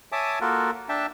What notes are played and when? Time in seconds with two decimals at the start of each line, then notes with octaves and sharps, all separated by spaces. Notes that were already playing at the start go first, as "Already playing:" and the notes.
0.12 C#5 E5 G#5 A5 D6 D#6
0.41 A#3 F4 F#4 A4 A#4
0.89 D4 E5 G5 A5